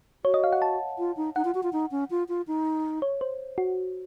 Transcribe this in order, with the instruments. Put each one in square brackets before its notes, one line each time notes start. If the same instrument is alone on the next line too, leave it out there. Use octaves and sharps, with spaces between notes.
[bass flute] F#4 [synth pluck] C#5
[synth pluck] D#5
F5
F#5
A5
[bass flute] F4
D#4
[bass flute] D#4 [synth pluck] F#5
[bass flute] F4
F#4
F4
D#4
C#4
F4
F4
D#4
[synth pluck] C#5
C5
F#4